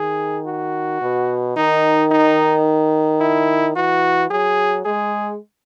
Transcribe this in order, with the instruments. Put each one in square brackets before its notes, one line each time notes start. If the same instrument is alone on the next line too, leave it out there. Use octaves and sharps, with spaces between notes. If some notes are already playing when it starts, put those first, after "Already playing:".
Already playing: [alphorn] D#3 [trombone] G#4
[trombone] F#4
[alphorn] B2
[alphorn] D#3 [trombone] D#4
[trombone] D#4
E4
[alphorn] E3 [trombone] F#4
[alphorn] F#3 [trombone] G#4
[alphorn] G#3 [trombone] G#4